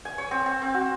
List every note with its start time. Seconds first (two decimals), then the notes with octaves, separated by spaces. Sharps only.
0.05 G#5
0.18 C#5
0.31 C4
0.46 C4
0.62 C4
0.74 F#4